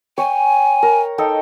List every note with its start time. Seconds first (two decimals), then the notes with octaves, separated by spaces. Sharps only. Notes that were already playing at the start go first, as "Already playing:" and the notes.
0.18 C#5 G5 G#5
0.83 A#4
1.18 D#4 A4 G5